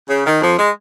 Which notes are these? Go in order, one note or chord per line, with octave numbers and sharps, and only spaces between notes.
C#3
D#3
F2 F3
G#3